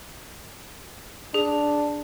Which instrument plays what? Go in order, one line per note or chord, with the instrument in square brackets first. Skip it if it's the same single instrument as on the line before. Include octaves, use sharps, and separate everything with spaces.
[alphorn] D4 [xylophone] G#4